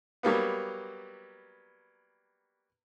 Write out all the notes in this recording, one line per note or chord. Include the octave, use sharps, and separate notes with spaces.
F#3 G3 A#3 B3